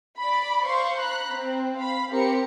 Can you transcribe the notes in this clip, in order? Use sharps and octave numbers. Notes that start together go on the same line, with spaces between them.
D5 B5
C5 F5 C6 C#6
A#5 B5 F#6
C4
F5 B5
C4 G4 A#4 C#7